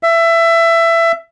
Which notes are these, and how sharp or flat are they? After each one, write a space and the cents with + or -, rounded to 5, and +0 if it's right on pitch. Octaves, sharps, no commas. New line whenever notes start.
E5 +20